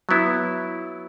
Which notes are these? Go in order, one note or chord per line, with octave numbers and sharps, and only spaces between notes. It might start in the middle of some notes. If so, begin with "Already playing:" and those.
F#3 B3 E4